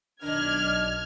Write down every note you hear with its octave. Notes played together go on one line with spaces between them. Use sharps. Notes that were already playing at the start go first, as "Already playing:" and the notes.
B1 D#3 D4 F6 G#6